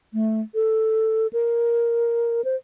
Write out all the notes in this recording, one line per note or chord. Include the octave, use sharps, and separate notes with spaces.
A3
A4
A#4
C5